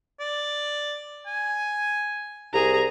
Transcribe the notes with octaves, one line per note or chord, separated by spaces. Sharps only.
D5
G#5
C2 G#4 A#5